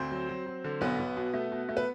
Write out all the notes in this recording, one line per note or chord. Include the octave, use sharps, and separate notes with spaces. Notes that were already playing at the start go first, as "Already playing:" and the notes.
Already playing: D2 C4 C5
F#3
F#3
F#3
D3
B1 B3 B4
B1
B2
A3
B2
A3
B4